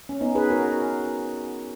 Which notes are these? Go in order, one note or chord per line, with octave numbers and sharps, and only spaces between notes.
C#4
B3 D#4
G#4 B4
F#4 A#4